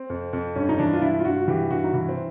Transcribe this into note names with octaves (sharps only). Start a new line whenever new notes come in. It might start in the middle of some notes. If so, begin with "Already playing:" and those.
Already playing: C4
F2
F2
G2 C#4
D#4
E3 D4
F4
G2 E4
F4
G2 F#4
E3 G4
G2 F#4
D#4
E3 E4
C4